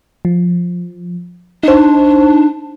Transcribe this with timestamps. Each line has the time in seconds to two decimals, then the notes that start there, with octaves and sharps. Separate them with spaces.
0.25 F3
1.63 D4 D#4 C5